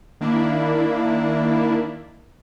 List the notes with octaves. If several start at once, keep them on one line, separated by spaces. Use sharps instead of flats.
D#3 A#3 D4 E4